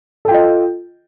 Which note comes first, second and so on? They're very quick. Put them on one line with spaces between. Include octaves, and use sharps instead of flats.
A4 G5 F4 D#5